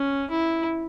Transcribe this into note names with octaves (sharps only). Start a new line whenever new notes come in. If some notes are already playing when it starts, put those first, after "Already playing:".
Already playing: C#4
E4